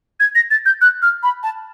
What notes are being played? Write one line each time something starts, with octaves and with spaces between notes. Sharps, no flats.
G#6
A#6
A6
G6
F#6
F6
B5
A5